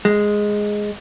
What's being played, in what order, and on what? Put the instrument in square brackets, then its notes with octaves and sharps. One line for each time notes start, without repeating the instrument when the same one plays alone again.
[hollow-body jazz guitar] G#3